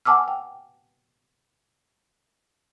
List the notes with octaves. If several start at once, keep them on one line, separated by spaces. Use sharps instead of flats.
F#5 G#5 A5 D6 E6 F6
G5